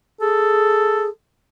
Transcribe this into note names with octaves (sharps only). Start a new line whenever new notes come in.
G#4 A4